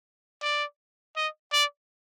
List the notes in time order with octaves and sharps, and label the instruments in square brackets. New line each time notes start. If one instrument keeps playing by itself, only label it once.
[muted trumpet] D5
D#5
D5